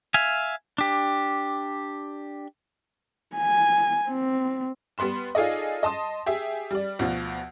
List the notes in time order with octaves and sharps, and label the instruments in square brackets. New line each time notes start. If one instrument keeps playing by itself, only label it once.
[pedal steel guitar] E5 F5 G#5
D4 G4
[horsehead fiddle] G#5
C4
[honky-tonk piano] G3 B3 B4 C6 E7
D#4 F4 G#4 A4 D5 D#5
D#5 A5 C6 D#6
G4 G#4 E5
G3 D5
D2 B2 F3